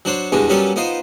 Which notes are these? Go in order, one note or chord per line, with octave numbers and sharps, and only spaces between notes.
F#3 D4 C5 C#5
E2 B2 G3 G#3 D4
F#3 G3 B3 C#4 A4 A#4
B3 D#4 F4 C5